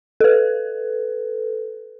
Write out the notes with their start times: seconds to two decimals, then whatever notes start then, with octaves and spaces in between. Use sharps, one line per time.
0.20 A4 B4